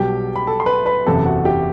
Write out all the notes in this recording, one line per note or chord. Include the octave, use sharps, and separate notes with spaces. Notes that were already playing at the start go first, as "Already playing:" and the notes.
Already playing: B1 B2 G3 G4 G5
B5
A4 A5
C6
B4 B5
B4 B5
F#1 E2 C3 E3 A4 A5
F#4 F#5
G4 G5